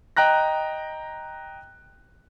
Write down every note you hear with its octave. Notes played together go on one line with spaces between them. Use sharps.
D#5 G5 A#5 F#6 A#6